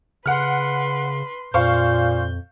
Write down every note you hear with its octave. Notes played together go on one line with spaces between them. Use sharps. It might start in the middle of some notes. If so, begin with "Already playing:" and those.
C#3 B4 F#5 C6 F6
F2 A#2 C5 F5 C#6 G6